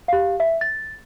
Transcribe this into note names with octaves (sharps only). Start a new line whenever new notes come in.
G4 F5
E5
A6